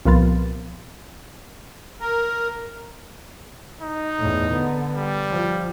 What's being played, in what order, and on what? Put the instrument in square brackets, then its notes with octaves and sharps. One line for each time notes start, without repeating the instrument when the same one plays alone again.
[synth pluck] C2 A#2 F3 B3 A6
[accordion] A#4
[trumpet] D#4
[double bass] E2 A2
D3 B3
[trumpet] G3
[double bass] F3